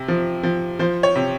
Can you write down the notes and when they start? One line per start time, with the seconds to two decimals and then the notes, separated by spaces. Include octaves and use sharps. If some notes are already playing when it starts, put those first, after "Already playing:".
Already playing: C3
0.08 F3
0.43 F3
0.79 F3 C5
1.03 C#5
1.16 C3